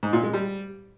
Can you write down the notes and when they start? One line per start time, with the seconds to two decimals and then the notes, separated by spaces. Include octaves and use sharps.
0.03 G#2
0.13 A#2
0.23 G#3
0.33 G3